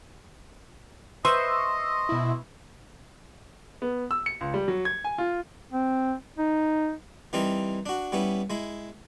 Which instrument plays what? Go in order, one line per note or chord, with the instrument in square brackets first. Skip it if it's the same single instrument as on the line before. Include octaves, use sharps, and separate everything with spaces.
[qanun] B4 C5 E5 [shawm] D#5 [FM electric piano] C6 C#6 E6
[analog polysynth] B2 E4
[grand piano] B3
E6
C#7
C#2
G3
F#3
G#6
G#5
F4
[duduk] C4
D#4
[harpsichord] E3 G3 C4 D#4 A#4
D4 F#4
G3 B3 C#4 E4
G#3 E4